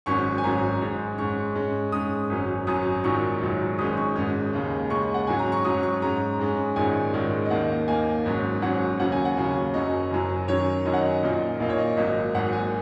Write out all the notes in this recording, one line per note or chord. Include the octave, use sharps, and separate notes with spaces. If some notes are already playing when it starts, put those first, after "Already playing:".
G#1 G#2 F#3 C#4 C#6
G#5
G#1 G#2 F#3 C#4 A#5
G#2 G#3 C#4
G#2 G#3 C#4 C#6
G#2 G#3 C#4
G#2 G#3 C#4 D#6
G#1 F#2 F#3 C#4
G#1 F#2 F#3 C#4 D#6
A#1 G#2 D#3 F#3 C#6
A#1 G#2 D#3 F#3
G#1 G#2 G#3 C#4 D#6
C#6
G#1 G#2 G#3 C#4
D#2 C#3 G#3
D#2 C#3 G#3 C#6
F#5
G#2 F#3 C#4 G#5
A#5
C#6
G#2 F#3 C#4 D#6
C#6
G#2 G#3 C#4 A#5
G#2 G#3 C#4
A#1 G#2 D#3 G#3 C#4 G#5
A#1 G#2 D#3 G#3 C#4
D#5
D#2 D#3 A#3 D#4 F#5
D#2 D#3 A#3 D#4 G#5
G#1 G#2 F#3 C#4
G#1 G#2 F#3 C#4 F#5
D#2 C#3 F#3 C#4 F#5
G#5
F#5
D#2 C#3 F#3 C#4
F#1 F#2 F#3 C#4 D#5
F#1 F#2 F#3 C#4
F#2 D#3 F#3 C#4 C#5
F#2 D#3 F#3 C#4 D#5
F#5
D#5
A#1 A#2 A#3 D#4
A#1 A#2 A#3 D#4
C#5
D#5
G#1 G#2 F#3 A#3 D#5
G#1 G#2 F#3 A#3 F#5
G#5